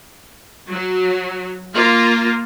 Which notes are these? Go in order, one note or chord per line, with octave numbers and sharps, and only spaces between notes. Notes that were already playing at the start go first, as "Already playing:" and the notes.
F#3
A#3 F4